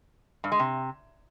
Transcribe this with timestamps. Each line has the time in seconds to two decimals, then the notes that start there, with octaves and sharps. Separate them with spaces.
0.44 G2
0.52 G#3
0.59 C3